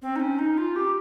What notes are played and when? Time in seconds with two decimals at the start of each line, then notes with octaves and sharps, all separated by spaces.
0.02 C4
0.16 D#4
0.20 C#4
0.39 D#4
0.58 F4
0.76 G4